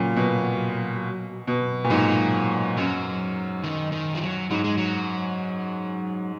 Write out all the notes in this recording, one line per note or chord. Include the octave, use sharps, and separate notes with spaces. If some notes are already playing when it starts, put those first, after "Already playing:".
Already playing: A#2 C#3 F#3
B2
B2
A#2
G#2 F#3
F#2 F#3
D#3
D#3
F3
F#3
G#2 F#3
G#3
F#3